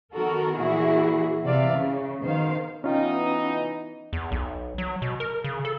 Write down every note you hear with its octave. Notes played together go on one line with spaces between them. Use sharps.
D#3 B3 F#4 A4 A#4
A#2 E3 E4 F#4 G#4
C3 E3 D5 E5 F5
C#3
B2 D#3 C5 F5
E3 B3 C#4 D#4 F4 G5
E2
B1
F#3
B2
A#4
C#3
A4